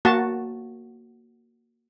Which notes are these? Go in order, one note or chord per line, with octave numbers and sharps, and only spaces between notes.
A#3 F#4 A5